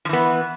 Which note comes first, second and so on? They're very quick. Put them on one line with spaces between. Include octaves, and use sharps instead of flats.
F3 E3 B3